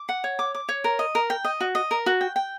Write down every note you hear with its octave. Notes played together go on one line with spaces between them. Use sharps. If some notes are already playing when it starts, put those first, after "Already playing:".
Already playing: D6
F#5
C#5
D6
D6
C#5
A#4
D#5
A#4
G5
D#5
F#4
D#5
A#4
F#4
G5
G5